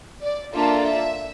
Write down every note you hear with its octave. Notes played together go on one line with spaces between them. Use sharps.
D5
A#3 D4 F4 A4 E5
E5